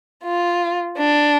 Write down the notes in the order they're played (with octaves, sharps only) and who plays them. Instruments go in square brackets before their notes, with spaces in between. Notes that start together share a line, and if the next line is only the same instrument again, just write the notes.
[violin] F4
D4